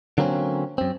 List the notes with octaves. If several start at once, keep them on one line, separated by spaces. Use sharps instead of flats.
D3 F#3 A#3 C4 C#4
F#2 C4